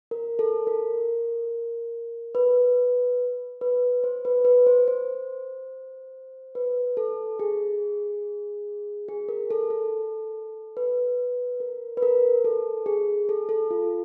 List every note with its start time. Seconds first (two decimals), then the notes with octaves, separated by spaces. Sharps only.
0.11 A#4
0.39 A4
0.67 A#4
2.35 B4
3.61 B4
4.04 C5
4.25 B4
4.45 B4
4.67 C5
4.88 C5
6.55 B4
6.97 A4
7.39 G#4
9.08 G#4
9.29 A#4
9.51 A4
9.70 A4
10.77 B4
11.60 A#4
11.97 B4
12.03 A#4
12.45 A4
12.86 G#4
13.29 A4
13.49 A4
13.71 F4